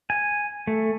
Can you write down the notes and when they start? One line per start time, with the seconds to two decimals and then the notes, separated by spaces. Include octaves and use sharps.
0.10 G#5
0.67 A3